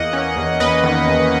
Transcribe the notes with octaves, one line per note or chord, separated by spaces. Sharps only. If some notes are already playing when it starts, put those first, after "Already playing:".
Already playing: E2 A#3 D#5 F#5
C#4
E2
E2 B4 D#5
D#3
E2